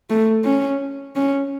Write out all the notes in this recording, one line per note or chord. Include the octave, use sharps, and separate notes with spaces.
A3
C#4
C#4